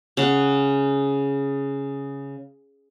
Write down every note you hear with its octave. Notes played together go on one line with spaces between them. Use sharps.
C#3 F#5